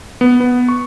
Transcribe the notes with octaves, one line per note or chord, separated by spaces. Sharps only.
B3
B3
C#6